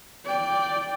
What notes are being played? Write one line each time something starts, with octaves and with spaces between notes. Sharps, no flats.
D5 G5